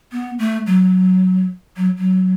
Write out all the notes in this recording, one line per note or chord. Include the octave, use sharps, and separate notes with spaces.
B3
A3
F#3
F#3
F#3